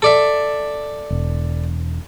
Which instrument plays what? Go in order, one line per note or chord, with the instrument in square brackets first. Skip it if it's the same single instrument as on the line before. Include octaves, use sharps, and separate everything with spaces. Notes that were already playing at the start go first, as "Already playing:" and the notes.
[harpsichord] A4 D5 E5
[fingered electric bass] E1